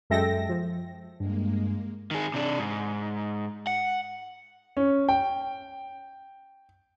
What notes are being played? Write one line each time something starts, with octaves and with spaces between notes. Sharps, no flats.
F#2 G#3 A4 E5 G5 A#6
F3
G2 G#3 A#3
D#3 G#4
C3 D4
G#2
F#5
C#4
G5